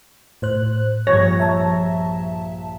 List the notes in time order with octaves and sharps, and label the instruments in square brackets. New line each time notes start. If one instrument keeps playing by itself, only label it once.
[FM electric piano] A2 C5 F#6
[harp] A#1 G2 F3 [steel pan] C#5 [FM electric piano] A#6
[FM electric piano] E5 A5 [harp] A#5 E6 A#6